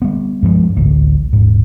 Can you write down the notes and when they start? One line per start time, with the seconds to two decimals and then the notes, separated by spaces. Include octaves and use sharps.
0.02 G3 B3
0.43 G2 F3 F#3 G#3
0.77 A1 D2
1.33 D#1 G#2